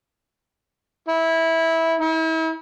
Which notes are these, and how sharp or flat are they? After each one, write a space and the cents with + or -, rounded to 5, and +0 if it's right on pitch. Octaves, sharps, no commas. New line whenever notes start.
E4 -15
E4 -40